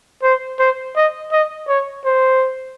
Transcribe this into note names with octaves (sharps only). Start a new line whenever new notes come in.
C5
C5
D#5
D#5
C#5
C5